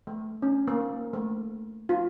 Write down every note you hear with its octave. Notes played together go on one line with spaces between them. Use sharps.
A3
C#4
A#3
A3
F4